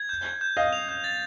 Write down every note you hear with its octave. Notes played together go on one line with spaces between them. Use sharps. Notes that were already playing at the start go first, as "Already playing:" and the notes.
Already playing: G#6
G6
G6
G6
D#5 F5 G6
F7
G6
A6